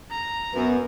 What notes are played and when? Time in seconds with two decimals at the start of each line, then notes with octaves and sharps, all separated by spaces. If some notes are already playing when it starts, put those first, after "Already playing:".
0.11 A#5
0.55 F#2 B3